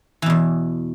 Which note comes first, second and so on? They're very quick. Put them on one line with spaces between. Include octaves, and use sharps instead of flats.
E3 B2 E2